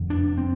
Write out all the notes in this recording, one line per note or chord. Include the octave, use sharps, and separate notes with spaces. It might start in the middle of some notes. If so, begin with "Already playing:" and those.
Already playing: F1 F2 D3
D4
C4